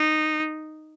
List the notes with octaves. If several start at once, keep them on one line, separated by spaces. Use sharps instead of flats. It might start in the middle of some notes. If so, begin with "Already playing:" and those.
Already playing: D#4